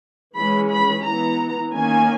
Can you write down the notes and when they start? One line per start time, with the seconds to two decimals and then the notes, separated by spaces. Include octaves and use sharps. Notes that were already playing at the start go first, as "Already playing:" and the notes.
0.36 E3 G#3 C#4 B5
0.70 B5
1.06 E3 B3 A#5
1.73 D#3 A#3 C#4 G#5